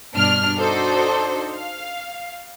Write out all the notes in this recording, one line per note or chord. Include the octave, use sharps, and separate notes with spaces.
G2 B2 D4 F6
D4 D#4 F#4 A4 C5
F5